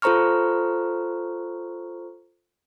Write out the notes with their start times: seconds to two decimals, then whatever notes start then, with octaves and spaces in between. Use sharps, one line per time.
0.02 F4 A4 C5 A#5 C#6 F6